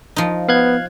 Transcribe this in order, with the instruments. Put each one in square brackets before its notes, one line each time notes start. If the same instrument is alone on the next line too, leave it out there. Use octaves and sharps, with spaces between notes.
[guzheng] F3 D#4
[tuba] B3 [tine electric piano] F5 F#6 G#6